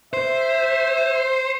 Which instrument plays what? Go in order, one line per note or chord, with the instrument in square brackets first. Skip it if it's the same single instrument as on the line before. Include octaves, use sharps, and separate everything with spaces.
[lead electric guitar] C5 [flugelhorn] E5